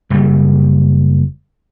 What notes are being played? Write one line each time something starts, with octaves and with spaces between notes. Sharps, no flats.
F#1 G3